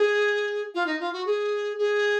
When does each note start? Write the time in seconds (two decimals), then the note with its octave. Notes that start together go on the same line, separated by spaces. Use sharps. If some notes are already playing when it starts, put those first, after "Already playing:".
Already playing: G#4
0.74 F4
0.86 D#4
1.00 F4
1.13 F#4
1.26 G#4
1.78 G#4